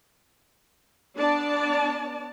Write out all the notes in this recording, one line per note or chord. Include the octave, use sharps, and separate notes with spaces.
B3 D4 D5 A5